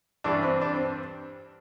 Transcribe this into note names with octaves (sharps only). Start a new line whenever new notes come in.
G2 E3 G3 D4
C4
D4
C4